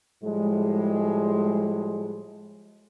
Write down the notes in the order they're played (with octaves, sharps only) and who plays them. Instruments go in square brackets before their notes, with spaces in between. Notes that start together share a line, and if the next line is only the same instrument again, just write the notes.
[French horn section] A2 F3 G3 G#3